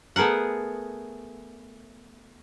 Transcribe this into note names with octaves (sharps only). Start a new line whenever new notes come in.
A3 B3 G#4 A#4 F#5